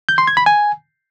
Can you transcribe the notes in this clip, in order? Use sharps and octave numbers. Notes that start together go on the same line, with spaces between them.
G6
C6
G#6
B5
G#5